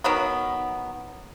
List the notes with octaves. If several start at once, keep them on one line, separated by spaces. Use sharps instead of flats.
D#3 F#3 B3